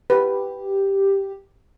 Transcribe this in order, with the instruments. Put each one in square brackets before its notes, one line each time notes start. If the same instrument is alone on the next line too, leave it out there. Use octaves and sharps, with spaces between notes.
[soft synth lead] G4 [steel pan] B4